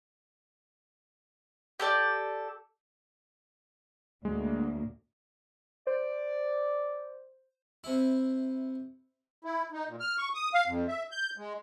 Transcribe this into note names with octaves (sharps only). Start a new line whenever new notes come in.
G4 A4 D5
D2 A2 G#3 A#3
C5 D5
C3 E4
E4
D#4
A#2
F6
C#6
D#6
F5
F2
E5
G6
G#3